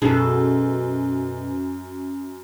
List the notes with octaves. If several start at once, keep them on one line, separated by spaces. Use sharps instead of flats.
F#2 B2 G#4 A4